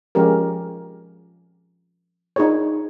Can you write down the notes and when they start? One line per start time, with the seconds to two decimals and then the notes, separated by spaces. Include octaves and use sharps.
0.15 F3 G#3 C#4 G4 A#4
2.36 D4 D#4 F4 G#4 C5 C#5